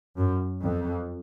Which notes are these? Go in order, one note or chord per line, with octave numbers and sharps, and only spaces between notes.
F#2
F2